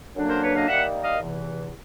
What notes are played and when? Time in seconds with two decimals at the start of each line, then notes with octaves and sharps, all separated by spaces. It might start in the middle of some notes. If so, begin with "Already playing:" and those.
0.16 F#2 D3 F#3 A#3 D4
0.29 A#4 C5
0.42 B4 C#5
0.55 D#5 F5
0.68 D#3 G3 A#3 E5 F#5
1.02 D#5 F5
1.19 E2 C3 E3